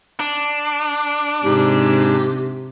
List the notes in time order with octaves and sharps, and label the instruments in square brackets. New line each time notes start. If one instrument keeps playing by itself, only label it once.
[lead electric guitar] D4
[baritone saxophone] G#2 [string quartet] C3 [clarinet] G4